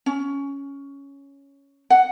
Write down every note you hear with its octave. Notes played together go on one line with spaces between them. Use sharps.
C#4
F#5